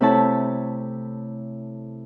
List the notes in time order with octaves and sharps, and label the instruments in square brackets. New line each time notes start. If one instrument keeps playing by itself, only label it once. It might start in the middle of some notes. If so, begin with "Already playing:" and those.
[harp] C3 A3 E4 C#5 A5